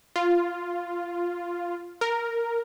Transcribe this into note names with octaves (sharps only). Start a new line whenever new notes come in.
F4
A#4